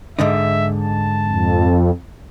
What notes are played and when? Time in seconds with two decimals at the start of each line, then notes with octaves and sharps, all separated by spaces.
0.19 G#2 D3 D#4 E5
0.79 A5
1.27 F2